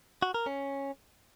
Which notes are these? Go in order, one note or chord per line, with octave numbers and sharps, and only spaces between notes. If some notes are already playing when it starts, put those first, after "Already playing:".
F#4
A#4
C#4